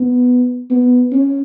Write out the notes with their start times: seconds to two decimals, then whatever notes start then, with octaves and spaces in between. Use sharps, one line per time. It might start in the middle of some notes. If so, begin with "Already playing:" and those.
Already playing: B3
0.70 B3
1.12 C#4